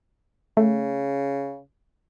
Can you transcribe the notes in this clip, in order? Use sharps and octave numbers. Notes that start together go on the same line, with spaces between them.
C#3 A3